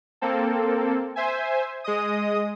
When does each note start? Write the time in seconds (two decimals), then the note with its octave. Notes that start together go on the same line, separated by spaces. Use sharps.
0.21 A#3 C4 A4
1.16 C5 E5 G#5
1.84 G#3 D#5 D#6